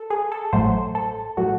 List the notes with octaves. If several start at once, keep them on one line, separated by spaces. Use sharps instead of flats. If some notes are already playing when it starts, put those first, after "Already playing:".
Already playing: A4
G#4
A4
A1 A2 F#3 A3 C5
A4
A2 F#3 A3 F#4